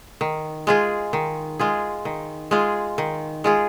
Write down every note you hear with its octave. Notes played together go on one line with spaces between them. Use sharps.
D#3
G#3 F4 G#4
D#3
G#3 F4 G#4
D#3
G#3 F4 G#4
D#3
G#3 F4 G#4